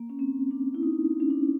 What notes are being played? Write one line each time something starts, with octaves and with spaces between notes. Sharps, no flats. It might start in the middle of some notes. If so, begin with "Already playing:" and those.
Already playing: A#3
C#4
C4
D4
E4
D#4
C#4
D4